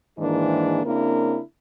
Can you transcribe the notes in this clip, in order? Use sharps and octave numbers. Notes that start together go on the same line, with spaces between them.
G#2 D#3 E3 A#3 D4 G#4
C#3 A#3 C4 D4 E4 A#4